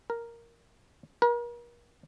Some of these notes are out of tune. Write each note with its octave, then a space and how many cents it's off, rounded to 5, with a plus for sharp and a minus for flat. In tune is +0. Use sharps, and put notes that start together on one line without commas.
A#4 +0
A#4 +40